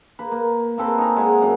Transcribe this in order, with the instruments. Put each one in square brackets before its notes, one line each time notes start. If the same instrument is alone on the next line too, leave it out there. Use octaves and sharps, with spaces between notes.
[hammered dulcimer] A#3 B4
A#3
A#3 C4 A4 B4
D#4 G#5 A#5
G#3 G#4 E5 F#5
F#2